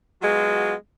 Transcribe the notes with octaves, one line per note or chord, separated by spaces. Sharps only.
F#3 G#3 B3 F4 F#4